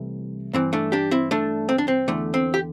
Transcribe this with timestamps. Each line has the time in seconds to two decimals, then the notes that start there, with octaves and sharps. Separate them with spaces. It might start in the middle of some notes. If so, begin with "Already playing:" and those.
Already playing: C2 C3 E3 A3
0.53 G2 E3 C4
0.73 A3 D4
0.92 D4 G4
1.11 C4 E4
1.31 A3 D4
1.69 C4
1.78 D4
1.88 C4
2.08 E2 D3 A3
2.34 C4
2.54 G4